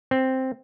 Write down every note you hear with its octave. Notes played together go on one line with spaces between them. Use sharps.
C4